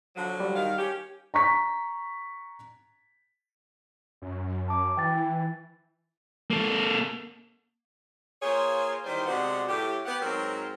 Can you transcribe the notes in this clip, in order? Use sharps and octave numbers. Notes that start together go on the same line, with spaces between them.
D3 F3 F#3
G3
D#3 F5
C#4 G4
A#5 C#6 B6
F#2
A5 D6
E3 G5 A6
A#3 A4
A#3 F4 G#4 C5 C#5
D#3 E3 G3 C5
C3 G#3 B3 D4 F#4 F#5
A2 G4
B3 G4 F#5
G#2 F#3 C4 A#4